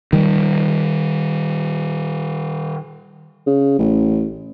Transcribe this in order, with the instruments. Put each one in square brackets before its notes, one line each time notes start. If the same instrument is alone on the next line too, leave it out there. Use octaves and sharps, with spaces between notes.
[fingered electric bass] D#3 G3
[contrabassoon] C#3
A1